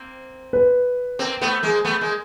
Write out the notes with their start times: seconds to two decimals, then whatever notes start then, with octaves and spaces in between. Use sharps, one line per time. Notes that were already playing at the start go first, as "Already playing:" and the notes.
Already playing: A#3 C4
0.53 B4
1.19 A#3 C4
1.41 A3 B3
1.63 G#3 A#3
1.85 A3 B3
2.01 G#3 A#3